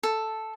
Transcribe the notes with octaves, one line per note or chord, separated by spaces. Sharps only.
A4